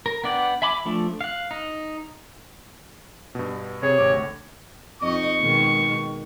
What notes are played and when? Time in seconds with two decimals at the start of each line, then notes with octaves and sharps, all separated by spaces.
0.06 A#4
0.24 B3 D4 D5 F#5 G5
0.62 E5 G#5 B5 D6
0.85 F3 A3 D4
1.21 F5 F#6
1.51 D#4
3.35 G2 B2
3.83 C3 G#4 C#5
3.98 G#1 C3 D6
4.14 D2
5.02 F2 D#4 D#5 C#6
5.41 B2 D#3 G#3